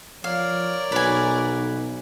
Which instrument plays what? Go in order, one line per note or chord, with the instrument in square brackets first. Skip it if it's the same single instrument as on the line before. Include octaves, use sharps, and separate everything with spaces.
[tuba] F3 [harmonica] A#4 C#5 D5 [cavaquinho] F5
[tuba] B1 [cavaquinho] B4 G#5